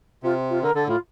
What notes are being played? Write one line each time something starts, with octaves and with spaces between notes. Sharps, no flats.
C3 F4
F4
D3 A#4
D3 A4
A2 F4